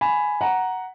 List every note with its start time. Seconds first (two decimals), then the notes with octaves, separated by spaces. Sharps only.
0.01 G#5 B5
0.41 F#5 A#5